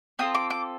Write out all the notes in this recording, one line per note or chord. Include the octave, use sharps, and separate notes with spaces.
C4 F4 A4 D#6
D6
D6